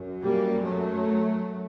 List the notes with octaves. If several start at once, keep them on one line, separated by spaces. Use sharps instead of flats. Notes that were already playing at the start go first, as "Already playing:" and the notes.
Already playing: F#2
G3 A#3
F#3 A3